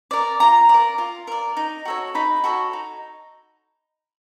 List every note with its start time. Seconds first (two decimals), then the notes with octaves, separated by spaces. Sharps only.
0.11 A#4 D5
0.40 F4 A#5
0.69 A#4 D5
0.98 F4
1.27 A#4 D5
1.57 D#4
1.85 F#4 A4 C#5
2.15 D#4 B5
2.44 F#4 A4 C#5
2.73 D#4